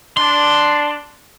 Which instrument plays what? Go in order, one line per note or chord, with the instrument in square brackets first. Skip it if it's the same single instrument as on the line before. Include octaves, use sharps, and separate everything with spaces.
[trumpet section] D4 [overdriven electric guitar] C6